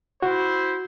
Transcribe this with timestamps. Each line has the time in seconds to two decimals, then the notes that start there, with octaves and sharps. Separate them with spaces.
0.22 E4 F#4 C5